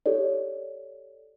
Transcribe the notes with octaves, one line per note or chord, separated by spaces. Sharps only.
G4 A4 C#5 D5